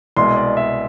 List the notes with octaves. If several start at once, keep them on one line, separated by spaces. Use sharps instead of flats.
C2 B2 G#3 C6
D5
E5